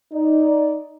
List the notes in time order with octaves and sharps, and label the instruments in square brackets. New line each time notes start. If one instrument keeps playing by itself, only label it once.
[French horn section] D#4 D5